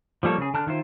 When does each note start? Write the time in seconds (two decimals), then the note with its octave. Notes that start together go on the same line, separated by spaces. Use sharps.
0.23 F3 G3 A#3 A4 C#5
0.38 C#3 G#4
0.54 D3 A5 F6 F#6
0.67 D#3 E4 F4 C5